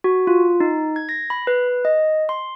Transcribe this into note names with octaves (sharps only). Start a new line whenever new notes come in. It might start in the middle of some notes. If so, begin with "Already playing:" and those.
F#4
F4
D#4
G#6
A#6
B5
B4
D#5
C6